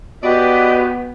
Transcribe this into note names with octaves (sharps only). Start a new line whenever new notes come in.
B3 F#4 G4 B4 D5 D#5